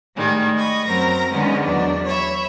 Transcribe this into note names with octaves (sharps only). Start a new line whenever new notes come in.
A2 D#3 G3 G#3
D#5 B5 C#6
F#2 F#3 C4 A#4 A#5 A#6
D3 D#3 G#3 B3 C#4
E2 F#3 D4
C#5 E5 B5